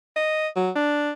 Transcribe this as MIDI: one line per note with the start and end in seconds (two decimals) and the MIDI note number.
0.16 0.48 75
0.56 0.71 54
0.76 1.12 62